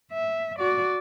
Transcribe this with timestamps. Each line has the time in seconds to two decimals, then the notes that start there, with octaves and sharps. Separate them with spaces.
0.12 E5
0.59 F#4 D5